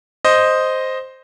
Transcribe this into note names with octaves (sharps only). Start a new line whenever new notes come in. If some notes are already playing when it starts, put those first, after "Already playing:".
C5 D#5